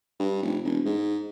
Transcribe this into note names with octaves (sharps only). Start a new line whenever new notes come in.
G2
F1
E1
G#2